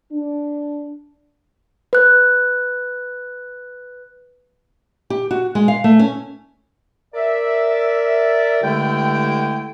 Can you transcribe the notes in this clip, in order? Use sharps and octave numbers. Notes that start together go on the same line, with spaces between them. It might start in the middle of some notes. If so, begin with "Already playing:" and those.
D4
B4 F#6
G4
F#4
G#3
F5
A3
C#4
A#4 D5 E5
G2 D3 G#3 A3 E4 G5